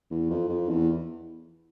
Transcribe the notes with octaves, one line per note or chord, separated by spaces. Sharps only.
E2
F2
F2
E2